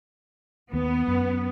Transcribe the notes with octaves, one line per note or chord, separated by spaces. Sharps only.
D#2 B3
F#2